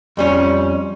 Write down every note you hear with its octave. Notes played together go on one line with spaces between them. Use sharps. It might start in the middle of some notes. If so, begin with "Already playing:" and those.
F2 G3 C#4